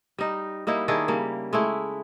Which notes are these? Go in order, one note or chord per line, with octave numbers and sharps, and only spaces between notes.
G3 D#4
G3 A#3 D#4 E4
D#3 D4 E4 G#4
C#3 G3 A#3
G#3 A3 E4